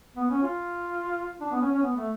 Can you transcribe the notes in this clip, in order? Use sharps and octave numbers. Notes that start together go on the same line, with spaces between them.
B3
C#4
F4
D4
B3
C#4
C#4
B3
A3